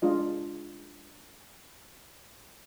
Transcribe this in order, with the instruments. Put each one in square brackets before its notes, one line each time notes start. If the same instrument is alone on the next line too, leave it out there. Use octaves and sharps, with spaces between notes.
[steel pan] G#3 D4 F4 D#5